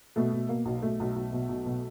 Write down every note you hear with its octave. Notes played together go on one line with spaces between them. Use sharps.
B2 A3
B2
B2 A#3
B1
B1 A3
B1
B1
B2
B1
B2